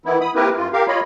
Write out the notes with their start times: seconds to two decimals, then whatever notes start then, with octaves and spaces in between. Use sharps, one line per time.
0.05 D#3 E3 B3 E4
0.21 B5 D#6
0.35 A#3 C4 E4 G4 A#4 B4
0.57 F#2 F4
0.73 G4 A#4 F5
0.88 F4 C#5 D#5 B5